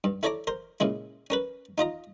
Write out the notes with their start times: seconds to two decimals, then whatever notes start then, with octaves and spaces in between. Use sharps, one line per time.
0.04 G2
0.23 E4 A4 C#5 D5 A#5 D6
0.47 A#4 C5
0.80 A#2 C#3 G#3 E4
1.30 C#4 A#4 B4
1.78 D#4 F4 D#5 A#5